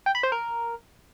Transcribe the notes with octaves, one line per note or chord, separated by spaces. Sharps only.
G5
B5
C5
A#4